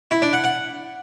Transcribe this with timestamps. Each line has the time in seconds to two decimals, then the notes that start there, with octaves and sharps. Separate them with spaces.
0.11 E4
0.22 D4
0.33 F#5
0.44 F#5